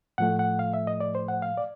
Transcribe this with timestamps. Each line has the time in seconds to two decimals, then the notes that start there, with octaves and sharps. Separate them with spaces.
0.18 A2 F3 A3 F#5
0.39 F#5
0.59 F5
0.74 E5
0.87 D#5
1.00 D5
1.15 C5
1.28 F#5
1.42 F5
1.57 D5